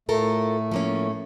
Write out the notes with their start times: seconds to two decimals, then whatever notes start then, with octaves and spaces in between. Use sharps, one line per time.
0.09 A2 A3 F4 A4 A#4
0.71 F3 A#3 C#4